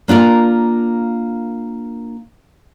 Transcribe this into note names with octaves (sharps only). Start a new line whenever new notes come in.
A#3 D4 F4 A#4